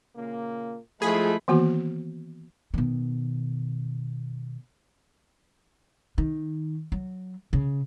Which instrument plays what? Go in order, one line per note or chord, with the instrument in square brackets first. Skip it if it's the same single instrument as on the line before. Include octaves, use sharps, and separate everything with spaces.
[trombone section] A#2 C#3 A#3
[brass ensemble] F3 G#3 A3 [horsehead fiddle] E4 B5 [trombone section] F4 [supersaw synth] G#4
[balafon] D#3 E3 A#3 B3 F#4
[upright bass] B2 D#3
D#3
F#3
C#3